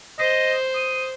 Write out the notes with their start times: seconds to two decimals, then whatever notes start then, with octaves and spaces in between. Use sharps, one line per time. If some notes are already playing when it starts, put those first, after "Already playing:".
0.19 C5 D#5
0.75 D#6